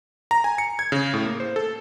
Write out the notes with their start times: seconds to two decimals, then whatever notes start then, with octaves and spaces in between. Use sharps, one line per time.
0.31 A#5
0.44 G#5
0.58 C#7
0.79 G#6
0.92 C#3
1.14 A2
1.26 A#3
1.40 C5
1.56 A4